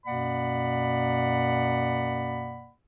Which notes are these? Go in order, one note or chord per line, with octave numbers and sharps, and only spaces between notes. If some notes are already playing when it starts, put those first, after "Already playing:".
F#2 B2 A#3 D5 F#5 B5